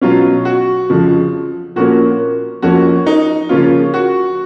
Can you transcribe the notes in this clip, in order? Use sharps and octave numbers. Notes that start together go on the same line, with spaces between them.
B2 F#3 C#4 F4
F#4
F2 C#3 F3
A#2 F3 A#3 C#4 F#4
F2 F3 A#3 C#4 F#4
D#4
C#3 F3 A#3 C#4 F4
F#4